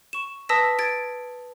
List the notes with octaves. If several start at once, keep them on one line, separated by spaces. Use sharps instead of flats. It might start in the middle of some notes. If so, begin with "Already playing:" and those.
C#6 E7
B4 A5 D#6 E6 A#6 B6
G#6 A6 D7